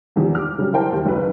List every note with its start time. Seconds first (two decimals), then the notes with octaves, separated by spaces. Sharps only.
0.16 E2 C3 D#3 F3
0.35 D6 F6
0.58 C#3 F#3 G3 G4
0.73 E4 A#4 C5 G5 A5
0.92 D#2
1.06 F#1 F#3 B4